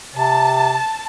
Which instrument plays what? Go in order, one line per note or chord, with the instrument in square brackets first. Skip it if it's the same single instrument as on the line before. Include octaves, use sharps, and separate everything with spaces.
[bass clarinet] C3 [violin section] A5